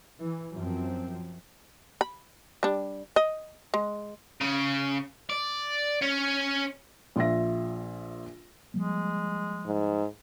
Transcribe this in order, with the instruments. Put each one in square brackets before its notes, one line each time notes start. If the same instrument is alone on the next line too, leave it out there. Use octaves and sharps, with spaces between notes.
[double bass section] E3
F#2 F3 C4
[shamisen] B5
G3 D4
D#5
G#3
[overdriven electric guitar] C#3
D5
C#4
[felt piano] A#1 F4 E5 A#6
[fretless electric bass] F3 G3 A#3 [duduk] G#3
[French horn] G#2